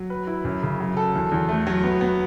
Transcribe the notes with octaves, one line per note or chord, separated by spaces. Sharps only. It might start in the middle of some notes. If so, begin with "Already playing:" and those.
Already playing: F#3
B4
E4
F#2
C#3
F#3
A4
E2
E2
A3
F#3
B3
B3